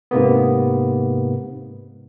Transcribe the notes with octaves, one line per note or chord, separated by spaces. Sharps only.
G#2 C3 A#3 B3